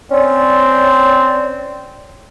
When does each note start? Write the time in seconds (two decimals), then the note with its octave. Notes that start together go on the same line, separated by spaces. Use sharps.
0.11 C4 C#4 D5